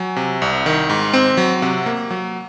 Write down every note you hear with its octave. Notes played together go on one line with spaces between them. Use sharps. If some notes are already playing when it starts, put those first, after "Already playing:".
Already playing: F#3 G#5
C3
C2
D#3
G#2
C4
F#3
C3 F#5
A#3
F#3